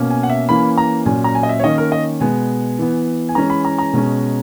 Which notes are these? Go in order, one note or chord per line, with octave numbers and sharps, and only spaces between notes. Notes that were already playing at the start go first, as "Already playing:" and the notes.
Already playing: B2 A#3 C#4
G#5
F#5
E5
E3 A#3 C#4 B5
A#5
A#2 F#3 C#4 G#5
A#5
G#5
D#5
E5
C#5
D#3 A#3 C#4 D#5
A#4
D#5
B2 G#3 B3 G#5
E3 B3
G#5
E3 G#3 C#4 A#5
B5
A#5
A#5
B2 G#3 C#4